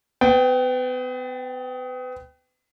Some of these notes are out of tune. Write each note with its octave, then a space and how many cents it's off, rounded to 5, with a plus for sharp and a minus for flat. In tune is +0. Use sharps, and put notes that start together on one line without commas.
B3 +35 G5 +0